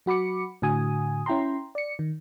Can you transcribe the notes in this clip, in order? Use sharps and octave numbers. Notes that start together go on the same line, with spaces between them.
F#3 F#4 B5 D6 C#7
A2 D3 F#4 G#5 D#6
C#4 E4 G5 A#5 C6
D5 C#7
D#3